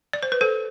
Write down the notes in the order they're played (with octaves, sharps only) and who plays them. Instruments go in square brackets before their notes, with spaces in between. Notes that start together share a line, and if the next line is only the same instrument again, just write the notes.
[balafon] D5
C5
B4
A4 C5